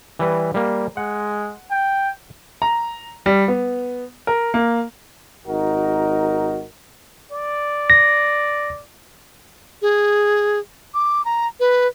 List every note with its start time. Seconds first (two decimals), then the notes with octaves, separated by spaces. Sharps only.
0.19 E3 G3 B4
0.54 G3 A#3
0.97 G#3 F#5
1.71 G5
2.62 A#5
3.26 G3
3.48 B3
4.27 A#4
4.54 A#3
5.47 G#1 D#4 F#4 A#4
7.32 D5
7.90 A#6
9.82 G#4
10.94 D6
11.25 A#5
11.60 B4